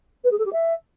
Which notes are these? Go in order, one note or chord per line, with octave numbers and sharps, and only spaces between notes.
B4
G#4
A4
G4
E5